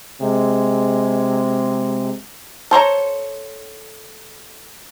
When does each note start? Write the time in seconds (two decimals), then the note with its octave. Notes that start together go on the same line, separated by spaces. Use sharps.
0.21 C3 G#3
2.71 A4 C5 C#5 A#5